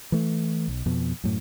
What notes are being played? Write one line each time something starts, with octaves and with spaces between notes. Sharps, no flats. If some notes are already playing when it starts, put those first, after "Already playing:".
E3 A3
B1
F2 B2
F#2 A2